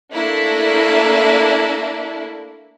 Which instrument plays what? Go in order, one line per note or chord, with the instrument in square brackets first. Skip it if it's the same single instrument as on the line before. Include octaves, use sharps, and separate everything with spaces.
[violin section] A3 A#3 D4 E4